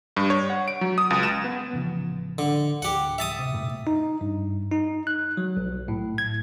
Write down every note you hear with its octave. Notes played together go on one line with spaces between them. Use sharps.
G2
C#5
F#5
D7
F#3
D#6
C#2
E7
B3
A1 C#3 F3
D3
D1 G4 F#5
E5 A5 D#6
C3
F#2 A#2 A3
D#4
G2
D#4
F#6
F#3
B1
A2
G#6